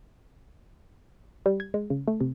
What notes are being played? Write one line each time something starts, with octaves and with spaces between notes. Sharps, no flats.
G3
G#6
G#3
C#3
A3
C3